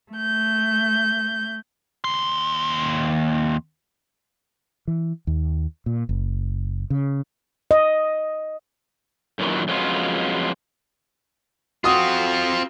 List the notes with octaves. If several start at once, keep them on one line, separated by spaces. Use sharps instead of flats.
A3 G6
D#2 C6
E3
D#2
A#2
F#1
C#3
D#5
F#2 A#2 D#3 E3 F#3
F2 F#3 G#3 B3 C#4 F4
C4 F4 F#4 D#6